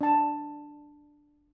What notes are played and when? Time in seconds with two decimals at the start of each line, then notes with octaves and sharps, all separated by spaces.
0.01 D4 A5